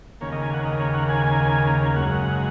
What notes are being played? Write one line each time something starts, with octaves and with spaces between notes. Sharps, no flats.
D#2 C#3 A#3 C#5
D#5
G#5
F#5
D#5
C#5
F#5
G#5
F#2 C#3 G#3 F#5